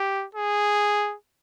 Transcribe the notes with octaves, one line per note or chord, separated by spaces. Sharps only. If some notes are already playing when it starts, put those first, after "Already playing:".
Already playing: G4
G#4